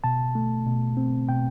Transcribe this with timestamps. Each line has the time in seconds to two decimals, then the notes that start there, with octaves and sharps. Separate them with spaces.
0.04 B2 A5
0.35 A3
0.66 B2
0.97 C4
1.28 B2 G5